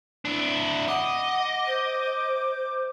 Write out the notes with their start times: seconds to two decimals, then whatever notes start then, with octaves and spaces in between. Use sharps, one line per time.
0.25 D4 E4
0.88 D#5 F#5 D6
1.66 C5